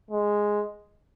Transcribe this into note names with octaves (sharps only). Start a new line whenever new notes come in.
G#3